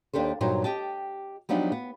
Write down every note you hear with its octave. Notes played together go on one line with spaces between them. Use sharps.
D#2 D4 G4 A4 C5
G2 A#2 F#3 D#4 C5
G4 D#5 G5 A5
F3 F#3 B3 D4 D#4 G4
B3